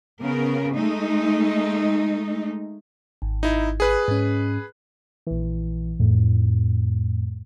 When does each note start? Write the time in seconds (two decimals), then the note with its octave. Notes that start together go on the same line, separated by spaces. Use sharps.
0.22 C#3 B3 A#4
0.74 G#3 A3 D#4
3.22 G#1
3.43 D#4 E4
3.80 G#4 B4 F#6
4.08 G#2 C#4
5.27 A#1 E3
5.99 F2 A2